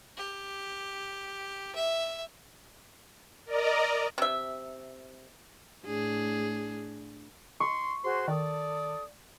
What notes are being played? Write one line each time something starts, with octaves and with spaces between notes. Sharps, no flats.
G4
E5
A#4 D5 D#5 A#5
C3 E5
A2 D4 G#4
C6 C#6
F#4 G#4 C5 C6
D#3 A4 D5 D#6